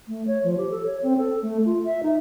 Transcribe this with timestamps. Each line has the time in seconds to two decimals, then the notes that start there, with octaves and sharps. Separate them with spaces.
0.08 A3
0.27 C#5
0.44 F3
0.58 G4
0.71 A4
0.86 C#5
1.03 C4
1.18 A4
1.42 A3
1.66 F4
1.85 E5
2.03 D#4